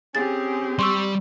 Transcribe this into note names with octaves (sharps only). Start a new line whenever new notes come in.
C4 C#4 G4 G#4 A6
G3 C6 C#6 E6